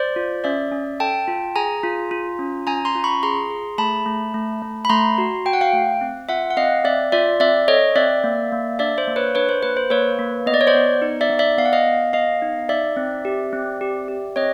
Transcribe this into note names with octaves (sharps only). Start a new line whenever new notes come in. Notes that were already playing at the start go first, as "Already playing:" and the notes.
Already playing: C5 D5
F4
C#4 D5 E5
C#4
A4 G5 A5
F4
G#4 G#5 A#5
F4
F4
C#4
C#4 G#5 A#5
A#5 C6
F4
B5 C#6
G#4 A#5 C6
G#4
A3 A5 B5
A3
A3
A3
B5
A3 A#5 C6
F#4
F#4 G5
F#5
F5 G5
A3
C4
F4 E5 F#5
F#5
C4 D#5 F5
C4 D5 E5
F4 D5 E5
C4 D5 E5
A4 C#5 D#5
C4 D5 E5
A#3
A#3
D4 D5 E5
C5
A#3
B4 C#5
D4 B4 C#5
C5
A#3 B4
C5
A#3 B4 C#5
A#3
B3 D#5
D5
C#5
C5 D5
B3
D#4
D5 E5
B3
D5 E5
B3 F5
F#5
D#5 F5
B3
B3 D#5 F5
D#4
D#4 D5 E5
C4
G4
C4
G4
G4
C4 C#5 D#5